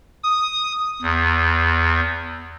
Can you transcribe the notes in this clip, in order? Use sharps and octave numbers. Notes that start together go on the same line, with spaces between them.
D#6
E2